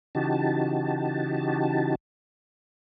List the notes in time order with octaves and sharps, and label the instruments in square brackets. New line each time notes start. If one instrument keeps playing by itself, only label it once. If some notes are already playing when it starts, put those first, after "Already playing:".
[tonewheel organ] C#3 E3 D#4 F#4 G4 A5